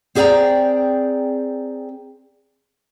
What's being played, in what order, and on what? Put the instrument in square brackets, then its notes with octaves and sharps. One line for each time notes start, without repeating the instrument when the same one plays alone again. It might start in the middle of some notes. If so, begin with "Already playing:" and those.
[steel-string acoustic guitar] C4 G#4 D5 E5 G5 A#5